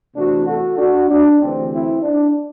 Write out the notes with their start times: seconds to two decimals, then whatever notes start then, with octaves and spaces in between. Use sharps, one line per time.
0.16 E2 C3 E3 A3 C4 D4 F#4
0.47 F#4 A4
0.78 D4 F#4
1.09 D4
1.40 D2 C3 E3 A3 C4
1.72 C4 E4
2.02 D4